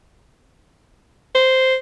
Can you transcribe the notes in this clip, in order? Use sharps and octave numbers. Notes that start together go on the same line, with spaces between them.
C5